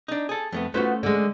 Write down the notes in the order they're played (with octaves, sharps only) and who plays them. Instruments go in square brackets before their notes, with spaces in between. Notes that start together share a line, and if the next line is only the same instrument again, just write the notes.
[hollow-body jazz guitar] D4 D#4
G#4 A4
F2 A3 B3
[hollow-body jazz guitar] A3 C#4 C5 [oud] B3 F4 F#4
[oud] D3 G#3